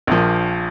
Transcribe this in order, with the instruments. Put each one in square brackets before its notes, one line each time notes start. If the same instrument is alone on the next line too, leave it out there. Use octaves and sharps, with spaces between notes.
[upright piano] A#1 A#2 F3